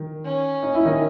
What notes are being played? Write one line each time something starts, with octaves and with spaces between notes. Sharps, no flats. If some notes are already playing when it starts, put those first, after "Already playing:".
Already playing: D#3
C#4
D#4
E4
D#3 D#4